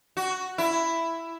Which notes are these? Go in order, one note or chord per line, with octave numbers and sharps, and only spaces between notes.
F#4
E4